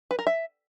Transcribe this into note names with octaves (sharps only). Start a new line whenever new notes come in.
B4
A#4
E5